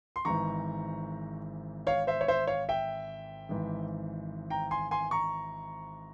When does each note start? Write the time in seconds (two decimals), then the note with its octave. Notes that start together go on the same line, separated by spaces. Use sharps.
0.16 C6
0.25 G#1 G#2 E3 A#5 C#6
1.87 C#5 F5
2.07 C5 E5
2.21 C#5
2.28 C5 E5
2.47 C#5 F5
2.69 E5 G5
3.49 G#1 G#2 E3
4.50 G5 A#5
4.71 G#5 C6
4.91 G#5 C6
5.11 A#5 C#6